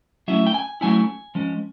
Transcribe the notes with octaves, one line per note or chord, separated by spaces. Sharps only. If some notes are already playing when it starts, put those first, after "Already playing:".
F#3 A3 C#4 E4 E5
G5
G#5
F#3 A3 C#4 E4 G#5
F3 G#3 C#4